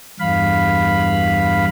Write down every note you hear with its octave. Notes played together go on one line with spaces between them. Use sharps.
E2 G2 F5 B5